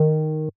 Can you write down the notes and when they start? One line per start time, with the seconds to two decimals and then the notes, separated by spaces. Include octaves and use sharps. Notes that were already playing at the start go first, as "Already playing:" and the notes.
Already playing: D#3